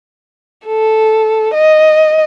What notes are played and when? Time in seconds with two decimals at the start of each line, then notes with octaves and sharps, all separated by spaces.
0.66 A4
1.54 D#5